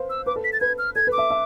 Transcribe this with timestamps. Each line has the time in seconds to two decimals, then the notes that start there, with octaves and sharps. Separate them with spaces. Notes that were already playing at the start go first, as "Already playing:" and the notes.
Already playing: B4 C5 F5
0.10 E6
0.26 B4 D6
0.36 A4
0.44 B6
0.53 A6
0.61 B4 G#6
0.78 F6
0.96 A4 G#6
1.07 B4
1.12 D6
1.18 E5
1.30 E5